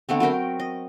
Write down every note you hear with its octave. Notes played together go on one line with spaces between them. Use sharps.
D3 A3 B3 C4
F#3 C4 A#4 G5
D#5